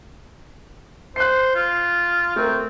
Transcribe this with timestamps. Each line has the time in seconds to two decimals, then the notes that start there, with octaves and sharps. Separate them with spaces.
1.16 C5 F#6 C7
1.55 F4
2.36 A3 C4 A#4